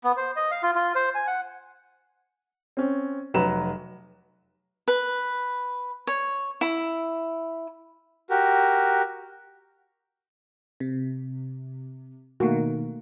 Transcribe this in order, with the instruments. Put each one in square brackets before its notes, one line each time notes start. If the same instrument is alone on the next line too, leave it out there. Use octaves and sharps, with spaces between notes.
[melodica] B3
C5
D#5
F5
F4
F4
C5
G#5
F#5
[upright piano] C4 C#4
F1 F#3 B4 A#5 E7
[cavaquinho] B4
C#5
E4
[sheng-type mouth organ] F#4 G4 A#4
[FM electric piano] C3
[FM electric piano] B2 D#3 [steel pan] A3 A#3 F#4